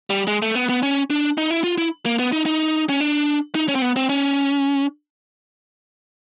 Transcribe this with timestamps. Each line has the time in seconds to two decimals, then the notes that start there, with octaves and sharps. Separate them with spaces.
0.10 G3
0.28 G#3
0.42 A3
0.55 B3
0.69 B3
0.83 C#4
1.10 D4
1.38 D#4
1.51 E4
1.64 F4
1.78 E4
2.06 A#3
2.19 B3
2.32 D#4
2.46 D#4
2.89 C#4
3.01 D4
3.55 D#4
3.68 C#4
3.75 C4
3.82 B3
3.96 C4
4.09 C#4